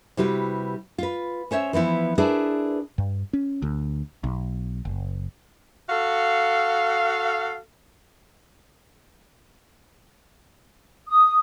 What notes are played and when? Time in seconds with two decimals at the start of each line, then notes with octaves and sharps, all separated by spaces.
0.17 C3 G3 E4 F#4 B4
0.98 F4 B4
1.51 C#4 C5 C#5 E5
1.73 E3 F3 B3 E4
2.18 D4 E4 G#4 A#4 B4 D5
2.98 G2
3.33 C#4
3.62 D2
4.24 B1
4.85 F#1
5.88 F#4 A4 F5
11.08 D#6